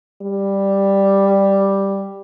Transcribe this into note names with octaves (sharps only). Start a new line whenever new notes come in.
G3